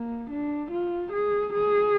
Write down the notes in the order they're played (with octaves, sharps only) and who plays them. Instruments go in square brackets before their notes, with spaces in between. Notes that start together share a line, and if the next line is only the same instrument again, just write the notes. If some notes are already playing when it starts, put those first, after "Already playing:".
Already playing: [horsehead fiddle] A#3
D4
F4
G#4
G#4